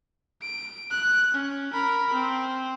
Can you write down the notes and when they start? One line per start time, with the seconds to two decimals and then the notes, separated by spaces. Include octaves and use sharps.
0.42 D7
0.91 F#6
1.34 C#4
1.73 A#4 B5
2.13 C4